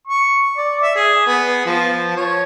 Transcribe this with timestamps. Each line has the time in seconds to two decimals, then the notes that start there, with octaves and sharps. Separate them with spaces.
0.07 C#6
0.57 D5
0.82 E5
0.96 G#4
1.26 B3
1.66 F3
2.16 C#5